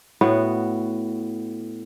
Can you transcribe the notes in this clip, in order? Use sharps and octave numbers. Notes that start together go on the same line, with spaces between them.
A2 B3 F#4